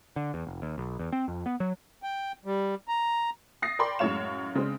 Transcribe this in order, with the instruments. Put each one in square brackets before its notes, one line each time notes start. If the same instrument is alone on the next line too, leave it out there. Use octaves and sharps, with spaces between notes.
[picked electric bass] D3
E2
F1
D#2
B1
E2
C4
F2
B3
F#3
[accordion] G5
G3
A#5
[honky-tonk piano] D#6 A6 A#6 C7
A#4 D5 G5 B5 C6 D6
F#2 A2 G#3 C#5 F5 E7
C#3 G#3 C4 D4